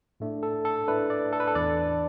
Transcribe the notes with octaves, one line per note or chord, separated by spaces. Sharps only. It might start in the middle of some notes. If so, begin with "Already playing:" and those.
A2 A3 D4
A4
A4
A2 A3 D4 B4
D5
A4
B4
A4
E2 E3 D4 D5